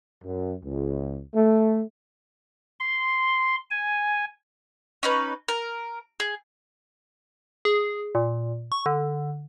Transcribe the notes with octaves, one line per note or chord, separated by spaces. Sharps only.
F#2
C#2
A3
C6
G#5
C#4 D#4 B4
A#4
G#4
G#4
A#2
C#6
D3